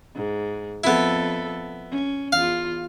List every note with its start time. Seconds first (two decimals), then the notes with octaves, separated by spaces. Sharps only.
0.15 G#2
0.84 F2 B3 E4 A4
1.91 C#4
2.32 E2 F4 F5